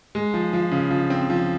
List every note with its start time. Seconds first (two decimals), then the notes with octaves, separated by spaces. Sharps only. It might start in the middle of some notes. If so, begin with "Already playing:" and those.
0.15 G#3
0.34 F3
0.53 F3
0.71 C#3
0.91 F3
1.10 C4
1.30 F3